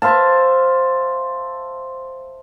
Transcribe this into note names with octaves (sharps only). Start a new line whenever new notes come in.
C5 E5 F5 A5